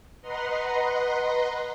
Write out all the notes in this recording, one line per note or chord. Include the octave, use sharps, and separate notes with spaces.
B4 D#5 F#5 A#5 C6